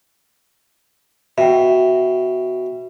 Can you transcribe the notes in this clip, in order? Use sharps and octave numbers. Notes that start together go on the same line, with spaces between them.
B2 E5 G5